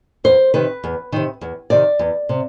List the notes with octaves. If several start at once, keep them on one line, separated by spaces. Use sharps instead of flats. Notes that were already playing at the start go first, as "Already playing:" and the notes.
E2 C5
C3 D#3 B4
E2
C3 D#3
E2
C3 D#3 D5
E2
C3